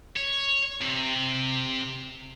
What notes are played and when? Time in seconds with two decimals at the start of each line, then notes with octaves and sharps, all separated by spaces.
0.17 C#5
0.81 C3